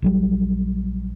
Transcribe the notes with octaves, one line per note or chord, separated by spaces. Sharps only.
A#1 F#3 G3